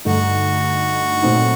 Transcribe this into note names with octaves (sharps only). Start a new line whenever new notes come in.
G2 D3 A3 D#4 F#4
A#2 F#3 A3 C4 D#4